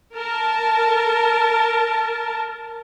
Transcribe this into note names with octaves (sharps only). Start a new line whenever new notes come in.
A#4 A5